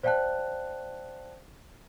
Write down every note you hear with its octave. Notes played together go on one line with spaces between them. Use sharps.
C5 D5 F5 G5 A5 F#6